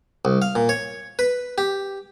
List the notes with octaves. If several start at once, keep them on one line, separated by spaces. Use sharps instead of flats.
C2
F5
A#2
C#5
B4
G4